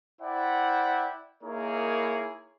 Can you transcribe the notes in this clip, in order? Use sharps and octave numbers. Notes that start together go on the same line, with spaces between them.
E4 C5 D5 E5 F#5 G5
A#3 D#4 E4 G#4 A#4 C#5